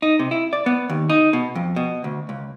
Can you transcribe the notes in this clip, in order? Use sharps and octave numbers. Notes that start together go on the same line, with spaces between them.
D#4
C3
E4
D5
B3
D#2
D#4
B2
F2
B2
D2
C#2